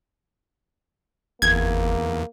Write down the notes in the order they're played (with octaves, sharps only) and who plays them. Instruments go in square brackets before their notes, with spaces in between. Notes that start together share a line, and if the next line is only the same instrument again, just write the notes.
[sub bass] G1 [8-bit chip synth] E2 [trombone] A#3 [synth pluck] G#6